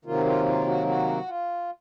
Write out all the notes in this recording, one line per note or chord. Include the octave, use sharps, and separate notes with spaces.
C3 D#3 F#3 A#3 F4
F4
F4
F#4
F#4
F4